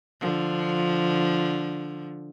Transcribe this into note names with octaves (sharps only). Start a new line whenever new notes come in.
D3 F3